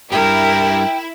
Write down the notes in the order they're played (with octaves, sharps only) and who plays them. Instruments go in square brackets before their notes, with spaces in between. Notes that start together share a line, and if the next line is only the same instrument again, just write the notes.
[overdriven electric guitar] G2 G4 [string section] E4 [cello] A#4 [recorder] G5